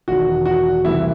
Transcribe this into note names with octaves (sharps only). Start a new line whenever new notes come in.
E1 E2 D#3 F#4
F#4
C2 C3 E3 E4